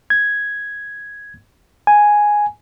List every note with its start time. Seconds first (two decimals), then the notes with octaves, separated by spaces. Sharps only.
0.10 G#6
1.87 G#5